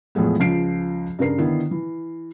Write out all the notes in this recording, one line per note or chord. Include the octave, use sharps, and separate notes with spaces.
E2 A2 F3 G#3 B3
C#2 F3 C7 D7
G2 C#3 A#4 C7
D3 D#3 B3 E4
E3